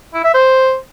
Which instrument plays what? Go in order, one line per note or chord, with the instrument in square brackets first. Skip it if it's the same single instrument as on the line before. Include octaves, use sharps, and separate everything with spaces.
[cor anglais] E4
E5
C5